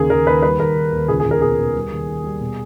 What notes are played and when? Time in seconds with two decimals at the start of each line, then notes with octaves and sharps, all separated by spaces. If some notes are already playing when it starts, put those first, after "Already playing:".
Already playing: D#2 C#3 G#4 A#4
0.10 D#2 A#4
0.26 D#2 B4
0.42 G3 B4
0.59 D#2 A#4
0.76 D#3
0.92 D#2
1.08 C#2 G#4
1.20 G#4
1.25 C#2
1.31 A#4
1.41 B2 G#4
1.58 B2
1.74 G3
1.92 D#2
2.07 D#3
2.24 G3
2.40 B2